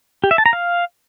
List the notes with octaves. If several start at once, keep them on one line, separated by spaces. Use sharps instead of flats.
G4
E5
A5
A#5
F5